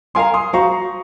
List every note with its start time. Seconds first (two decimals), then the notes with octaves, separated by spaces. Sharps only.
0.15 A#4 F5 G#5 A#5 C6
0.34 C6 D#6
0.53 F#4 C5 F5 A#5 C#6